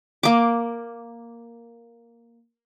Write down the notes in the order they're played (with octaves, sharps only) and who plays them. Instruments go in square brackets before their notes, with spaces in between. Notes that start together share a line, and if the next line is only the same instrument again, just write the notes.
[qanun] A#3 D6